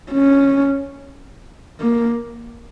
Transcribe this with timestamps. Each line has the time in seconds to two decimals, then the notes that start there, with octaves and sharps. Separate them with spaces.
0.12 C#4
1.80 A#3